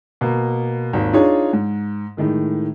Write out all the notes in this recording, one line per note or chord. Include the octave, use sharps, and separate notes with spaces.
B2 A#3
G#1 D#2
D4 D#4 F4 G#4 C#5
G#2
A2 D#3 G#3